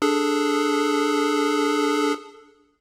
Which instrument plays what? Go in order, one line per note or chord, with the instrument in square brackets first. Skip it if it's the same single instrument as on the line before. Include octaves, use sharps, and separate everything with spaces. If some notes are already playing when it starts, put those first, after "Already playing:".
[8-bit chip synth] D4 G#4 A4